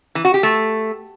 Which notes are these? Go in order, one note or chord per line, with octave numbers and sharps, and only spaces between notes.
E3
F#4
G4
A3